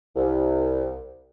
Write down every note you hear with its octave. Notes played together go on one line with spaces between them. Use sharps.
C2